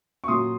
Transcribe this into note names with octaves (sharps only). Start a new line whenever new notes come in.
C#6
A#2 F#3 C6 D#6